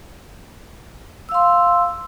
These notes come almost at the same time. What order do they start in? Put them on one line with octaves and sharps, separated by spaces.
E6 F5 C6